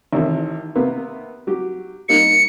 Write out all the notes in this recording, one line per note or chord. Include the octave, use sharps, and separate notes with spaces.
A1 C3 D#3
C3 A#3 B3
F#3 G4
G3 A#3 D#4 C#7